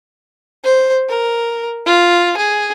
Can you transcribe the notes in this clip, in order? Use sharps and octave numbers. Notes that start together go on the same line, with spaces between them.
C5
A#4
F4
G#4